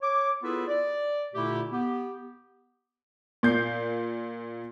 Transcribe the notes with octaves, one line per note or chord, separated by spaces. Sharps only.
C#5 D6
B3 E4 F4 G#4 A4 B4
D5
A#2 D3 A3 E4 G4
B3 G4
A#2 G6 C7